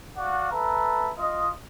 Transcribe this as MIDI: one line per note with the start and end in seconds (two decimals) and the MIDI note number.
0.17 0.51 66
0.17 0.51 74
0.17 0.51 77
0.17 0.51 78
0.51 1.12 59
0.51 1.12 69
0.51 1.12 71
0.51 1.12 76
0.51 1.12 82
1.18 1.50 65
1.18 1.50 75